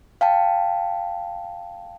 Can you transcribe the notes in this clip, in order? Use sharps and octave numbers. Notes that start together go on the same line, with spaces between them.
F5 G5 A5